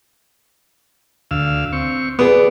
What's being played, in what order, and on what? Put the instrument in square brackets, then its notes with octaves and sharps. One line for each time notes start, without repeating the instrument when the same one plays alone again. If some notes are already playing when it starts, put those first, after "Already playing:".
[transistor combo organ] D2 F5 E6
C4 C#6
[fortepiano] B3 G#4 [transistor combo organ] D5